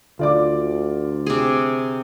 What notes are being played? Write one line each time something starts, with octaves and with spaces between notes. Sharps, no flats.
D2 D3 F4 D5 D6
C3 G#4